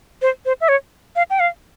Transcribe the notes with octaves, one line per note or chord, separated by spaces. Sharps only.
C5
C5
E5
C#5
F5
G5
F5